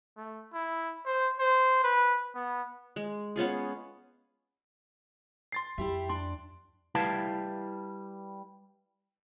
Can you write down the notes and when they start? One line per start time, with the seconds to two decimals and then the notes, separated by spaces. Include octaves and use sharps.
0.17 A3
0.53 E4
1.06 C5
1.39 C5
1.84 B4
2.35 B3
2.96 G#3
3.36 B3 C#4 F4 G#4
5.52 C6 A6 C7
5.78 F2 E4 G4 E5
6.09 D4 C6
6.95 G3 E4 B4 F5 A5